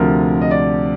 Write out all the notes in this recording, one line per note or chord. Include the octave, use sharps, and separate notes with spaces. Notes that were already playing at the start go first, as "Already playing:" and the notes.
Already playing: D2 C3 F3 A#4
D#5
D5